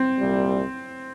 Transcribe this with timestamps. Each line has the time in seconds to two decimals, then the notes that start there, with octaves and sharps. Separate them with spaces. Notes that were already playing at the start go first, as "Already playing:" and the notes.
Already playing: C4
0.17 C2 A#2 G3